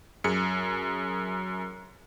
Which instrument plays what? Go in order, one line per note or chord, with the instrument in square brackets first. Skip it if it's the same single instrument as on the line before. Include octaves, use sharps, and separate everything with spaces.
[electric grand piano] F#2 G#4 C#7